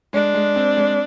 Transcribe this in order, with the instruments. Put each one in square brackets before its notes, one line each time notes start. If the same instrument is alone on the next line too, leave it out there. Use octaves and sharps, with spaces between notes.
[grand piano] G#3 [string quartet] D4
[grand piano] G#3
C4
G#3